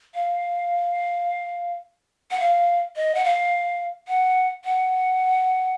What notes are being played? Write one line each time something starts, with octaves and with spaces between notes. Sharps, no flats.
F5
F#5
F5
D#5
F#5
F5
F#5
F#5